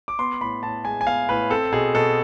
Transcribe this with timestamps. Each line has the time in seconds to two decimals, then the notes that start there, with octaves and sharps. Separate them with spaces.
0.08 D6
0.19 B3 C6
0.41 A2 B5
0.63 A2 A5
0.85 G#3 G#5
1.01 G#5
1.06 B3 F5
1.29 A2 B4
1.50 C4 A4
1.72 B2 G#4
1.95 B2 A4